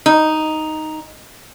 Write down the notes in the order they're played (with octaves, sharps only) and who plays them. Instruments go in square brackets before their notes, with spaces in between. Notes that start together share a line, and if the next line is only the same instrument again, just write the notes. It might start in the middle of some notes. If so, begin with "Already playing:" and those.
[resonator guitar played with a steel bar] D#4